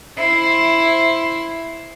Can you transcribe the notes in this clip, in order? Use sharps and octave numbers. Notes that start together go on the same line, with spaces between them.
E4 C5